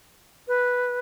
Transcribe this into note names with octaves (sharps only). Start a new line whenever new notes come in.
B4